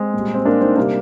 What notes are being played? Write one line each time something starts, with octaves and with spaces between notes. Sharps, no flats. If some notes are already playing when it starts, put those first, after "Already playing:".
Already playing: G#3 C4
A#2 G3
C4
A#3 D4
C4 D#4
C3 G3 A#3 D4